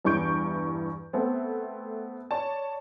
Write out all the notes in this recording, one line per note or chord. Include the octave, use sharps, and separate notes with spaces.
E2 G2 E3 C#6 G6 D7
A3 B3 C4
C#5 D5 A5